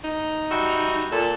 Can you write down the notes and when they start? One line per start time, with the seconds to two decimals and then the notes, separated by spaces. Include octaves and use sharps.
0.04 D#4
0.51 G3 F#4 E5
1.12 A#2 A4